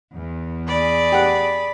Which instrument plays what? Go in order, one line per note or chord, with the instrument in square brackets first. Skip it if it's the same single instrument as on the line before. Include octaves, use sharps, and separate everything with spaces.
[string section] E2
[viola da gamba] G#4 D5 [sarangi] B5
[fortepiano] G4 F#5